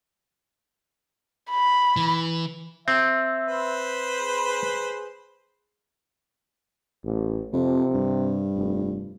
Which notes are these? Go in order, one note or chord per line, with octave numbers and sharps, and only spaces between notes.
B5
E3
C4 E5
B4 C5
G#4
A1
F2 C3
G2
F1